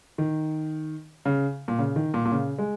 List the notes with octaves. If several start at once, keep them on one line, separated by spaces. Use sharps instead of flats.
D#3
C#3
A#2
C#3
D#3
A#2
A#2
C#3
G#3